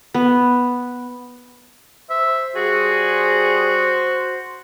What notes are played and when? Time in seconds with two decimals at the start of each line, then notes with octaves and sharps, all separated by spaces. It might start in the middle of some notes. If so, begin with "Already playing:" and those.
0.14 B3
2.10 C5 E5
2.56 G3 F#4 G#4